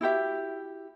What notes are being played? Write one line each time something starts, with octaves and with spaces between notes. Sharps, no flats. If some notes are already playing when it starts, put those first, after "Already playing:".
E4 F#4 G4 E5